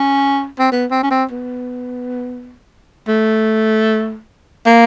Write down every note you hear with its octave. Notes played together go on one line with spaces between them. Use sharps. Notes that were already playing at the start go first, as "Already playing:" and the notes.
Already playing: C#4
C4
B3
C4
C#4
C4
B3
A3
A#3